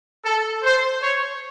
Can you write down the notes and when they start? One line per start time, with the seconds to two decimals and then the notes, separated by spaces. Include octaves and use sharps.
0.24 A4
0.63 C5
1.03 C#5